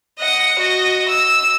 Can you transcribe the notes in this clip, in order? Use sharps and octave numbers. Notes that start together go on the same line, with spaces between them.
D#5 F#5
F#4 D#5
E6